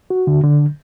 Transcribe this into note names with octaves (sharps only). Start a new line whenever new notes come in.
F#4
D3
D3